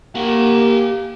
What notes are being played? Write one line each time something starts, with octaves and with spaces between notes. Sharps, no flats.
A#3 G4 F#5